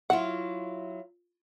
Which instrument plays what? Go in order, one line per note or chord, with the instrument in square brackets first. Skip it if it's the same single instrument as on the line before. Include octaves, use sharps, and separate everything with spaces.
[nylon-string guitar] F#3 E4 F4 [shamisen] F#5